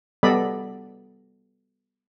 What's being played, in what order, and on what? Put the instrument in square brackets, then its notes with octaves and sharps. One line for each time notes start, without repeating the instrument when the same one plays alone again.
[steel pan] G3 B3 A4 D5 D#5 B5